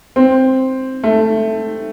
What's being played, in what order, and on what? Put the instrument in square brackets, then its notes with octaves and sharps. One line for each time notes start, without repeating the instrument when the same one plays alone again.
[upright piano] C4
A3